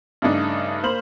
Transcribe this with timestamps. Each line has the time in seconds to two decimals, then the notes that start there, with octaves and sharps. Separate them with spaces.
0.22 G2 C#3 A3 D4 D#4
0.83 A#3 C5 B5 F6 F#7